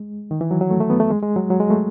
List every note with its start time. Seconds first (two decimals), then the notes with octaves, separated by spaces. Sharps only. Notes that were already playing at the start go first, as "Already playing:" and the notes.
Already playing: G#3
0.31 D#3
0.41 E3
0.51 F#3
0.61 F#3
0.70 A3
0.81 A3
0.90 B3
1.00 A3
1.11 G#3
1.23 G#3
1.36 F#3
1.50 F#3
1.60 G#3
1.70 A3